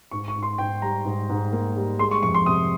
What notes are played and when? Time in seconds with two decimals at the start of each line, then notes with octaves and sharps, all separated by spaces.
0.11 G#2 C#6
0.28 C#6
0.35 G#2
0.43 C6
0.58 G#2 G5
0.82 G3 A#5
1.05 G#2
1.29 G#2
1.52 A#3
1.76 G3
1.99 G#3 C6
2.11 C#6
2.23 F2 C#6
2.34 C6
2.46 C3 D#6